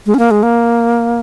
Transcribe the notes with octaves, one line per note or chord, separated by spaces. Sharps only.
G#3
C#4
A#3
G#3
A#3